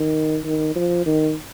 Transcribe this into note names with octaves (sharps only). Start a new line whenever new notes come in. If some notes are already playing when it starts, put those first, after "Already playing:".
Already playing: D#3
D#3
F3
D#3